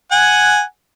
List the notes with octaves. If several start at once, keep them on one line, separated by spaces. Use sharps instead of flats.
F#5 G#5